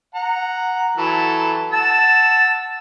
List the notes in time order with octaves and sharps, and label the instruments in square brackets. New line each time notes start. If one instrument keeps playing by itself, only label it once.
[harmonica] F#5 A#5
E3 F#3 A4
[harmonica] F#5 E6 [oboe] A5